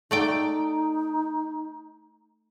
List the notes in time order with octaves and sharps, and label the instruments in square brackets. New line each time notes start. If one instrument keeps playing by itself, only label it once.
[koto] A3 D5 G5 [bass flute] D#4